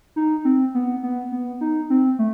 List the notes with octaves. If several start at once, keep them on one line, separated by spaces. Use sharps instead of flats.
D#4
C4
B3
B3
B3
D#4
C4
A3